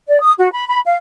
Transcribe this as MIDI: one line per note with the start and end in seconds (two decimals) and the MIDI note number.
0.09 0.19 74
0.22 0.33 87
0.38 0.51 66
0.53 0.67 83
0.68 0.80 83
0.85 0.97 77